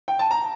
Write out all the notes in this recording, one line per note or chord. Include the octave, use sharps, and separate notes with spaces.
G5
A5
A#5